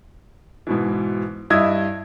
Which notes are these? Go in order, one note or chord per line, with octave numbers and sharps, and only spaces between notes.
G#2 B2 E3
G2 E4 D#5 E6 G#6